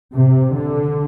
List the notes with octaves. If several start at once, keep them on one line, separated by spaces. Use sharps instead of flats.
C3
D3